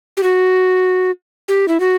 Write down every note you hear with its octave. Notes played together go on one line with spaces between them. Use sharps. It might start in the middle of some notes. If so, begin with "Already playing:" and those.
G4
F#4
G4
E4
F#4